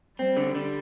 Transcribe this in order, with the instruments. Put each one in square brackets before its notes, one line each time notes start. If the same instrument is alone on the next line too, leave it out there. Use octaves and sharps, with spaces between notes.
[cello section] G3 [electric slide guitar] C4
[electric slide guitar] D3
D3